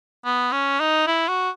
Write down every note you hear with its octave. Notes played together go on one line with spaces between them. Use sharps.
B3
C#4
D#4
E4
F#4